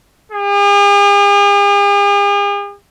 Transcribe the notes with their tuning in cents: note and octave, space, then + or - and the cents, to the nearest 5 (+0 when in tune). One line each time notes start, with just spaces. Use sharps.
G#4 -45